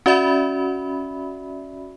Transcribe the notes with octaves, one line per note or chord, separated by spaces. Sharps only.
C#4 F#4 D5 E5 B5